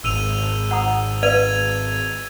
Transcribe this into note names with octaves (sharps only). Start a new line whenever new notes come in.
G#1 E6 D#7 F7
F#5 A#5 D#6
B4 D5 F5 G#6 D#7 F7